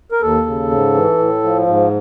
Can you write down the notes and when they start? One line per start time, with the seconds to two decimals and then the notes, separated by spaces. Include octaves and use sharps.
0.12 A#4
0.22 D#2 A4
0.46 C#3
0.71 G#2
0.94 E3
1.18 A2
1.44 F3
1.67 G#2